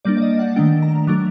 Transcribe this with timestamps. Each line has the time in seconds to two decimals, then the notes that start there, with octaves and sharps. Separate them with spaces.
0.05 G3 A#3 D4 D5
0.17 D5
0.22 D#5
0.39 F#5
0.56 D#3 A3 D4 G5
0.82 A#5
1.07 F#3 A3 D4 D6